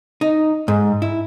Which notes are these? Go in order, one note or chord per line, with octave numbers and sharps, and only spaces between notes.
D#4
G#2
E4